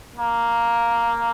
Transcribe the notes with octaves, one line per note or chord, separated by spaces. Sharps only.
A#3